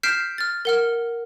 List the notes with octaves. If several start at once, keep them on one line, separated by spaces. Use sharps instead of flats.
F6 G6 B6 C7 D7 E7
F6 A6
A#4 F#5 F6